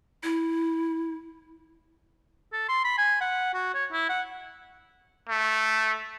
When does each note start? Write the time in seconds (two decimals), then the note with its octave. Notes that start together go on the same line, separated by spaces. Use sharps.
0.23 E4
2.53 A4
2.69 C6
2.85 B5
2.98 G#5
3.21 F#5
3.54 F#4
3.74 C#5
3.92 E4
4.09 F#5
5.29 A3